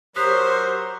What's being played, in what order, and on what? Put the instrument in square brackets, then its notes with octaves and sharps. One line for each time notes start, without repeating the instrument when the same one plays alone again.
[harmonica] F#3 A#4 C#5 [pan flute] G4 [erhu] C5 [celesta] D#6 F#6 B6